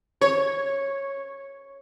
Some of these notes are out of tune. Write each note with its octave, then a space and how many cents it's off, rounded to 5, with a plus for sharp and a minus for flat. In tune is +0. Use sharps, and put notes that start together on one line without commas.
C#5 -10